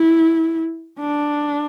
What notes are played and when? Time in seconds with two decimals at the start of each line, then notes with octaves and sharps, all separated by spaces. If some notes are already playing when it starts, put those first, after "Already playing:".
Already playing: E4
1.00 D4